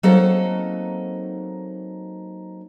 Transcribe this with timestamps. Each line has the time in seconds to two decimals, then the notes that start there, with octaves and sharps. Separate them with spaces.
0.03 F#3 A#3 C4 D#4 A4 F#5